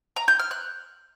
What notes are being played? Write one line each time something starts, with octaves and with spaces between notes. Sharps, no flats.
A#5
G6
F6
F#6